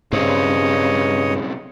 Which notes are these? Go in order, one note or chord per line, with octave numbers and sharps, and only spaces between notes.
B1 G2 C#3 C4 C#5 D#5